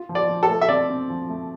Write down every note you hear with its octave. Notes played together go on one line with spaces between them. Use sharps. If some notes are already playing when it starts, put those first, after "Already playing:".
Already playing: F4
F3
D5
F3
A4
A3
E5
C4 D5
C4
F3
A3